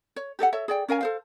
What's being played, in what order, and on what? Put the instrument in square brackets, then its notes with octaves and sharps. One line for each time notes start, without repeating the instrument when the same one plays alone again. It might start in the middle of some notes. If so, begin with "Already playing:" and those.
[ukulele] C#5
G4 A4 D5 F#5
A4 C#5 E5
G#4 D5 G5
C#4 A#4 F5 G#5
A4 C5 F5